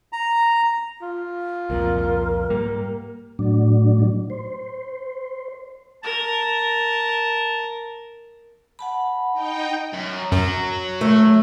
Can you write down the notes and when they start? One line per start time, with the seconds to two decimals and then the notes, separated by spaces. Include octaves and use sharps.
0.13 A#5
1.02 F4
1.70 C2 F2 A#2 A#4
2.50 G#2 G3 A#3
3.39 A2 F#3 D4
4.30 C5
6.03 A#4 A5
8.79 F#5 A5 B5
9.33 D#4 G5
9.93 F#2
10.32 F#2 F#3
11.01 A3